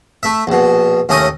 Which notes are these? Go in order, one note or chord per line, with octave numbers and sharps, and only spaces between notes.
A3 E5
A#1 B2
D#2 A3 C#4 D#5 D#6